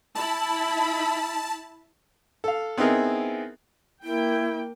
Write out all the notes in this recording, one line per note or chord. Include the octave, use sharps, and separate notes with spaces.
E4 A5 B5
A4 F5
B3 C4 D#4 E4 G#4 A#4
A#3 E4 G5